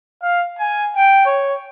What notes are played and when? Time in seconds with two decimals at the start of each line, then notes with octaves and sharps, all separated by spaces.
0.23 F5
0.59 G#5
0.96 G5
1.26 C#5